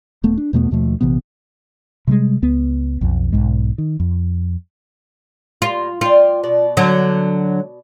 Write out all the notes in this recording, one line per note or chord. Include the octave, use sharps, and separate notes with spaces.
D#1 A3 B3
D4
E2 B2 A3 B3
D#2 B2 F3 A3
A#1 C3 E3 B3
C3 G3 G#3
C#2 B3
B1 F2
B1 G#2 G#3
D#3
F2
G3 A#3 F4
F4 D5 G5
B2 D5
D3 F#3